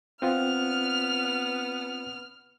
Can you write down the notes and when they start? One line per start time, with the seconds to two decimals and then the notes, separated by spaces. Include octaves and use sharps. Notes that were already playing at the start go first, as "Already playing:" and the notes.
0.22 B3 C4 F4 F6